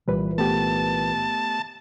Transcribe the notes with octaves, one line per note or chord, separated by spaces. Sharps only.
C2 A#2 E3 G3 B4
A3 B3 G4 A5